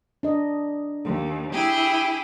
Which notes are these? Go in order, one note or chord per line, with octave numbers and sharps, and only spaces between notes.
D4 D#5
D#2
E4 G4 G#4